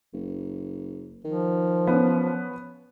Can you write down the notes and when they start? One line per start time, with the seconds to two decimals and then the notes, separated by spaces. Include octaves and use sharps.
0.14 F#1
1.25 D#3 F3
1.87 B3 C#4